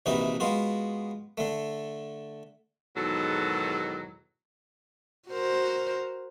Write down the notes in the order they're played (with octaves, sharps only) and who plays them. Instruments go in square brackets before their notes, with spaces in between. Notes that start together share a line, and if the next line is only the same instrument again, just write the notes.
[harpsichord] A#1 C3 E3 D#4 F#4 B4
G#3 B3 F4 F#4
D3 A3
[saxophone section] E2 G#2 B2 D#3 F#3 A4
[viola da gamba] F#4 A#4 C5